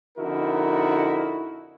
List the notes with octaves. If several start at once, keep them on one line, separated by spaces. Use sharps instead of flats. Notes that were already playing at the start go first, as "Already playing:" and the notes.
F2 D3 D#4 E4 F#4 A#4